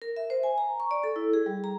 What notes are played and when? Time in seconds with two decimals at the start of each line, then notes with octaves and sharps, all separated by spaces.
0.02 A#4
0.16 E5
0.30 C5
0.43 G#5
0.58 A#5
0.80 C#6
0.91 D5
1.04 A4
1.16 E4
1.33 G#4
1.46 G3
1.64 A#5